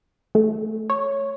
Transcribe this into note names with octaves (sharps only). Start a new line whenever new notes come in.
A3
C#5